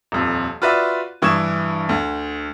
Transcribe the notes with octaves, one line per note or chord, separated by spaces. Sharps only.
D#1 F2
F4 F#4 B4 D5 E5
G2 E3 C#6 D#6 G#6 E7
D2